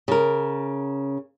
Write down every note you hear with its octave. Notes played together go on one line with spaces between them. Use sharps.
C#3 A#4